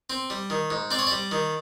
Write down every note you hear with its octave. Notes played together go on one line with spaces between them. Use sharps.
C4
G3
D#3
G#2
C4 D5
C#5
G3 D5
D#3